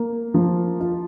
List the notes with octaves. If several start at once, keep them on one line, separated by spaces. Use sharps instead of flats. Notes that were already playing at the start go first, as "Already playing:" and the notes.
Already playing: A#3
F3
F4